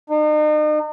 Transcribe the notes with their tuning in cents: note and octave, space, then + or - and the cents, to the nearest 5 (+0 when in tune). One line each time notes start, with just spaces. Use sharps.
D#4 -40